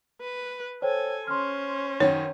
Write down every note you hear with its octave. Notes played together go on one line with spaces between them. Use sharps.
B4
A4 C5 C#5 G5 G#5
C#4 C5 C6 F6
F#2 D#3 C#5